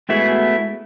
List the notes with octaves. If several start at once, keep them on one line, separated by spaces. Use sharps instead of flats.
G#3 A3 B3 E4 F#4 G#4